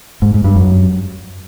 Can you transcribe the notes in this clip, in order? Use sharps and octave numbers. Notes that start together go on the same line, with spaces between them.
G#2
G#2
G2
F#2